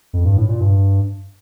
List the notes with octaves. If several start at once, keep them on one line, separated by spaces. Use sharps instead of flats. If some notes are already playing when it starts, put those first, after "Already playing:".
F2
G2
A2
A#2
G2